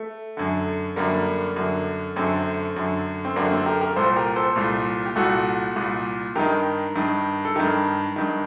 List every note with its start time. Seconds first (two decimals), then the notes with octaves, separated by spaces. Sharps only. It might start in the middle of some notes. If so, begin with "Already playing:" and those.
Already playing: A3
0.37 F#2 D3
0.96 F#2 D3 G3 A#3
1.56 F#2 D3
2.16 F#2 D3 A3 C4
2.76 F#2 D3
3.25 C4
3.36 F#2 D3 A#3 D4
3.51 A3 C4
3.66 G4 A#4
3.81 G4 A#4
3.96 C2 A#2 A4 C5
4.16 G4 A#4
4.36 A4 C5
4.56 C2 A#2
5.06 G4
5.16 C2 A#2 F#4 A4
5.76 C2 A#2
6.36 G2 D#3 G4 A#4
6.96 G2 D#3
7.45 A4
7.56 G2 D#3 G4 A#4
8.16 G2 D#3